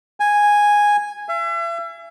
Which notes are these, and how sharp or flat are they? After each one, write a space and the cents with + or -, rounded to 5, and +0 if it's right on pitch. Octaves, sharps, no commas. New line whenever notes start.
G#5 -5
E5 +40